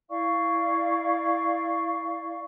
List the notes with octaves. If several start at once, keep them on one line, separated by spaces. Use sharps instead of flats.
E4 D5 F5 C#6